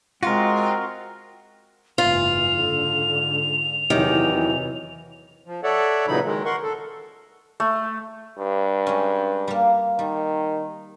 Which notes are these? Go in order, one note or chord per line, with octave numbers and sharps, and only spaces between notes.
G#3 C4 F4 F#4 A#4
F#1 G#2 E3 F4 F7
G#2 D3
E2 C3 D#3 E3 F#3 G4
F3
A4 C#5 D5 E5 F#5
A#2 C#3 E3 F#3 D#4 B5
D#3 G#3
A#4 F#5 C6 C#6
A4
A3
G2
G#3 C#4
G3 A#3
D#3 G3